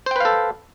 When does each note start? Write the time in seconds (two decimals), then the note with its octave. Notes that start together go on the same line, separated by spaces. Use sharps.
0.06 C5
0.11 G5
0.16 B4
0.20 F5
0.25 A4